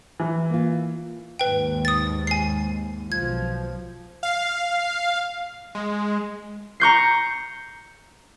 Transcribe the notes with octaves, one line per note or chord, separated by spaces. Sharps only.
E3
A#3 F4
D#2 G#2 B4 G5
D#6 A6
G#5 C7
B1 F3 G#6
F5
G#3
A#5 C#6 G6 C7